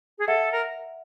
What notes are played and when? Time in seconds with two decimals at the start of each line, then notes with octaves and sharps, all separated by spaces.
0.18 G#4
0.27 A4 E5 F#5
0.52 A#4